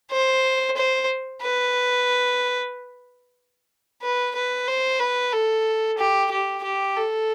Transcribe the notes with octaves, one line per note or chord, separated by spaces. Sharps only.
C5
C5
B4
B4
B4
C5
B4
A4
G4
G4
G4
A4